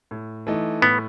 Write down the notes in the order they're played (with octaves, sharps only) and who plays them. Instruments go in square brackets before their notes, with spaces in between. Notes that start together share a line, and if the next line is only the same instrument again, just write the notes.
[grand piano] A2
E3 A3 D#4
[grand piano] A2 [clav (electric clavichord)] B3